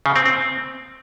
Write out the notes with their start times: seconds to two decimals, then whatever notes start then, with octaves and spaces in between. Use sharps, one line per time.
0.06 C#3
0.16 C4
0.26 C4